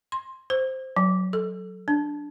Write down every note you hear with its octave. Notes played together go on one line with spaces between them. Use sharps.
C6
C5
F#3
A4
D4